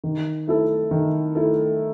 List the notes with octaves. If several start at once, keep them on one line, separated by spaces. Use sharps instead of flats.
D#3
A3 E4 A4
D#3
A3 E4 A4